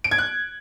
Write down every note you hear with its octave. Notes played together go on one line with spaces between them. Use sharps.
D7
G#6
F#6